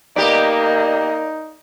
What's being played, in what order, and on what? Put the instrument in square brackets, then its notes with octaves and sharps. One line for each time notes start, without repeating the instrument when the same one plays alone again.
[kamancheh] A#3 D#5 [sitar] B3 G4 [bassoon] D#4 [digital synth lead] D5